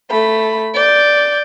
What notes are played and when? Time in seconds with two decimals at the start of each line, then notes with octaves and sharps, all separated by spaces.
0.10 A3 B5
0.75 D5 G6